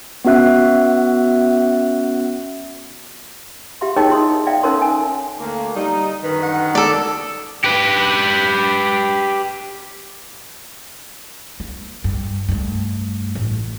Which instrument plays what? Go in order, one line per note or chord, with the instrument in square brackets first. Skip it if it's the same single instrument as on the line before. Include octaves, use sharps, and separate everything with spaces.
[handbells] B3 C#4 F#4 E5 F#6
[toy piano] G4 E5 F5 C6
D#4 G#4 A#4 C#5 D#5 G5
E4 C6 D#6
D5 E5 F5 G5
C#4 D#4 A4 A#4 C#5 C6
G#5
[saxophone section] D2 A#3
[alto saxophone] G3 [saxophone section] D#4
[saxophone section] F#2 D3 D#3 [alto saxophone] B4
[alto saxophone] F#5
[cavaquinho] A4 D5
[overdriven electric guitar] G4 B4
[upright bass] A#3
G2
G2 A3
A1